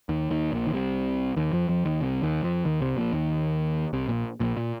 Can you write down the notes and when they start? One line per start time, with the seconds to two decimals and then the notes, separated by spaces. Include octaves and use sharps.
0.09 D#2 D#3
0.30 D#2 D#3
0.52 A#1 A#2
0.67 D#3
0.73 C2 C3
1.36 D#2 D#3
1.52 F2 F3
1.69 F2 F3
1.85 D#2 D#3
2.01 C2 C3
2.22 D#2 D#3
2.43 F2 F3
2.65 D#2 D#3
2.81 C2 C3
2.97 A#1 A#2
3.13 D#2 D#3
3.93 C2 C3
4.08 A#1 A#2
4.40 A#1 A#2
4.57 A#2